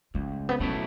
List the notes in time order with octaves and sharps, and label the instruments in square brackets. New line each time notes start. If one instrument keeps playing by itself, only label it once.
[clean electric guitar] C#2 [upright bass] A3
[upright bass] B3
[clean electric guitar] B2 F#3 A3 E4 [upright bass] C#4